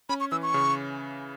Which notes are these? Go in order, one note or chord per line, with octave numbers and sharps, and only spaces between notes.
C#4 B5
C#6
E3 E6
C#6
C#3